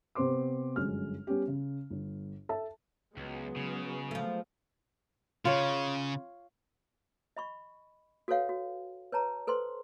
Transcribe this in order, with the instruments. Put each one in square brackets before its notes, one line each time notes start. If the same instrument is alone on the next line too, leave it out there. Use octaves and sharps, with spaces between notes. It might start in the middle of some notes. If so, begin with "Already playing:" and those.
[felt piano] C3 B3 C4 C5 C6 D6
G1 F#2 G#3 F6
G3 B3 C#4 G4
C#3
G1
A4 E5 A5
[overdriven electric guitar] C#2 [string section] F#3 G#3 B3
[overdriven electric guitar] C#3
[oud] F3 A3
[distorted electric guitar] C#3 [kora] F4 C#5
[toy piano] D#5 B5 C#6
F#4 A4 B4 C#5 F5 F#5
F#4
B4 C#5 A5 A#5
A4 B4 C5 C6